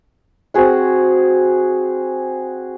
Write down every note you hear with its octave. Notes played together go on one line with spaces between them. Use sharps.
C4 F#4 G#4 F#5